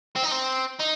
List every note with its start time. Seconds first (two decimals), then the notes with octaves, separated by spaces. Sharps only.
0.16 C4
0.24 D#4
0.32 C4
0.80 D#4